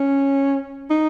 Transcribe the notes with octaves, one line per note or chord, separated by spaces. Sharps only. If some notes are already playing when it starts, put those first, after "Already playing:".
Already playing: C#4
D#4